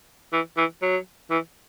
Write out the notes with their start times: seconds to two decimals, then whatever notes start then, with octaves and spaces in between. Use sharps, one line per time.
0.33 E3
0.57 E3
0.82 F#3
1.31 E3